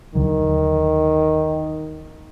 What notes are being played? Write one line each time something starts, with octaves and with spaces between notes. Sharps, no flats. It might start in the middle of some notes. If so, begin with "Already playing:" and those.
D#2 D3 D#3 F#3